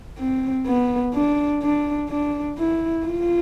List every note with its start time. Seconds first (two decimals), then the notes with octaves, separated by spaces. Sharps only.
0.19 C4
0.67 B3
1.15 D4
1.62 D4
2.10 D4
2.58 E4
3.06 F4